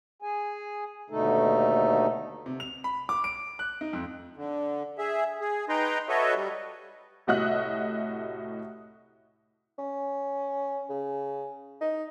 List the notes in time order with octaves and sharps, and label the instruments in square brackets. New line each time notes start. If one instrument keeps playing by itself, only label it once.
[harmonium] G#4 G#5
D#2 B2 D3 A3 D#4 A4
[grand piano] C3
F7
B5
D6
D7
F#6
D#4
F2
[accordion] D3
G#4 E5
G#4
D#4 B4 G5 A#5 C6
F#4 A4 B4 C#5 D#5 E5
G3
[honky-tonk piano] C2 A2 F#4 D#5 E5 F#6
[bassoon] C#4
C#3
D#4